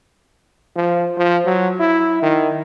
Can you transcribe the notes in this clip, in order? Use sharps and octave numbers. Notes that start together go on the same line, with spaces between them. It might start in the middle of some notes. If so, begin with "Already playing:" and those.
F3
F3
F#3
E4
D#3